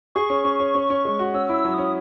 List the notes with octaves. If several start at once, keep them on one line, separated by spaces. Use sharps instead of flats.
G#4 C#6
C#4
C#4
C#4
C#4
C#4
G#3
F#4
C#4 E6
E4 E6
F#3
C#4 D#6